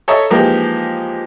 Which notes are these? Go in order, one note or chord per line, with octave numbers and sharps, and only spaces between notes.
A4 C#5 D#5 E5 A#5
E3 F3 G#3 A#3 D#4 G4